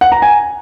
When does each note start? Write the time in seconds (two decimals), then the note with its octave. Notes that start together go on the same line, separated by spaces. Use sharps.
0.01 F#5
0.12 A#5
0.22 G#5